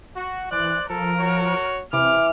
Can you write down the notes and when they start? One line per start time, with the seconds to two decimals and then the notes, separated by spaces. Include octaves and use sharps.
0.16 F#4
0.52 E3 C5 D5 F#6
0.90 F3 A4 A#4
1.20 F#4 C#5
1.93 C3 E3 D6 F6